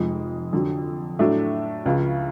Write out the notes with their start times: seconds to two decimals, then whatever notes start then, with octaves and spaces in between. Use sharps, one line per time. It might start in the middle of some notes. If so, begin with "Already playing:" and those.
Already playing: F1 F2 F3 G#3
0.53 F2 D3 F#3
1.19 A2 F#3 A3 D4
1.86 C#2 C#3 F3